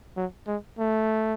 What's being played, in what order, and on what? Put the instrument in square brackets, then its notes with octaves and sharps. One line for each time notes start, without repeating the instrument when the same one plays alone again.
[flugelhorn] F#3
G#3
A3